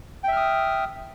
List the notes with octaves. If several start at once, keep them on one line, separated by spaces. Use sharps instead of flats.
E5 G5 D#6 F6